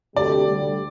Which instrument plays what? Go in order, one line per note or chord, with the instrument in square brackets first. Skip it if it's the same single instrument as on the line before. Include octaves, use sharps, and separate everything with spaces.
[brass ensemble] D2 C3 G3 D4 G4 [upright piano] D5
[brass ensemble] D2 D3 G3